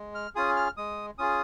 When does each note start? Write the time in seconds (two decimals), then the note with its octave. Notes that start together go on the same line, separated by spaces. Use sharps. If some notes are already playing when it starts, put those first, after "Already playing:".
Already playing: G#3
0.15 F6
0.35 C#4 F4 G#4 D#6
0.56 F6
0.77 G#3 D#6
1.18 C#4 F4 G#4 D#6